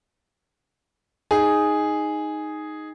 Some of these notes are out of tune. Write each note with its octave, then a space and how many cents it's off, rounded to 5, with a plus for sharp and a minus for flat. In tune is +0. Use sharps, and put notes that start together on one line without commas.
D#4 +0 G#4 +0